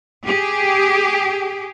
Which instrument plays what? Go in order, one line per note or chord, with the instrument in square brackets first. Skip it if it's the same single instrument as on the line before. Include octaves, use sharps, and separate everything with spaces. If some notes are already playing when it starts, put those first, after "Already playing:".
[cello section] G4 G#4